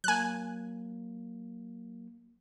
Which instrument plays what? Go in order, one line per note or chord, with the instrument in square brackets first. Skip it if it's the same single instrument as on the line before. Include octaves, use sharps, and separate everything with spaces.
[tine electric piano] F#3 A#3 [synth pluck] G#5 F#6